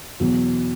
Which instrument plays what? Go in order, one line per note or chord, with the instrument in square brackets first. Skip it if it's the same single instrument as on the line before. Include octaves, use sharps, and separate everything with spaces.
[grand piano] E2 B2 F#3